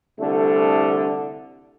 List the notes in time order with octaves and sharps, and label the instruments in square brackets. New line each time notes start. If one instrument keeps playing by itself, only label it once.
[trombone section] C2 D3 A3